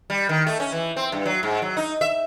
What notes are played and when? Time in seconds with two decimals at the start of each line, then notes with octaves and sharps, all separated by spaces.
0.10 G3
0.29 D#3
0.47 A3
0.60 C#4
0.72 E3
0.96 C4
1.12 G2
1.26 F#3
1.43 G#2
1.62 F#3
1.77 D#4
2.01 E5